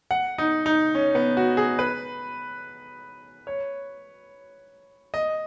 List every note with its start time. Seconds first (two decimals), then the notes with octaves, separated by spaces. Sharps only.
0.11 F#5
0.38 D#4
0.66 D#4
0.95 C#4
1.15 B3
1.37 F#4
1.57 G#4
1.79 B4
3.47 C#5
5.14 D#5